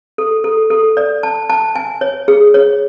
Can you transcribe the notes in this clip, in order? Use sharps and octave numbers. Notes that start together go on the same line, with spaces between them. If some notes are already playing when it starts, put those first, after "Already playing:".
A4
A4
A4
D5
A5
A5
G#5
C#5
G#4
C#5